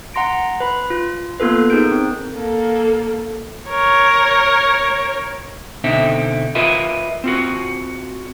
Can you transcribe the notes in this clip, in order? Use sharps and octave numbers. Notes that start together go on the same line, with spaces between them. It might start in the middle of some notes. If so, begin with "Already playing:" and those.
F#5 A#5 C6 A#6 D7
B4 B5
F4
A#3 B3 F4 A4 B4
D#4 G#4 A#4 G6 D7
C4
A#3 A4
A#4 C#5
B2 D3 C4 D#4 E5
F4 A#4 B4 D#5 E5
C4 F4 F#4